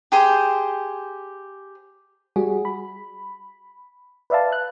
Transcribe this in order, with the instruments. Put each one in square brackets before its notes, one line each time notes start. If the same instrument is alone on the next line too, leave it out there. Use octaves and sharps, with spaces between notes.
[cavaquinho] G4 G#4 C5
[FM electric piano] G3 F#4 G#4
B5
B4 D5 E5 F5 A5
F#6